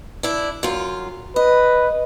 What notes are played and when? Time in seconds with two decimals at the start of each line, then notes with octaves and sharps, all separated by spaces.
0.23 D4 E4
0.63 F#2 F4
1.36 B4 D#5